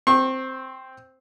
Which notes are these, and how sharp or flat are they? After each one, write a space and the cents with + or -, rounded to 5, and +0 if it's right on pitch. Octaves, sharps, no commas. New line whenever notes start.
C4 +0 C#6 -35